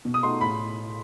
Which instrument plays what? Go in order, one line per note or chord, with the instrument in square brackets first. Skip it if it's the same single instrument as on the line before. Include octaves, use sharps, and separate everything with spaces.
[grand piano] B2
[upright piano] D#6
[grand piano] A3 D#4 F#4 [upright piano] C6
[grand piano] A2 [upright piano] B5